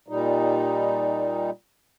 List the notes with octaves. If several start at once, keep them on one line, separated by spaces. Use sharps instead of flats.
A#2 G3 D#4